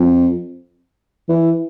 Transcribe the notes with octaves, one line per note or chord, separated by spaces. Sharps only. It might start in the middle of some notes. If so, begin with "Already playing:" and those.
Already playing: F2
E3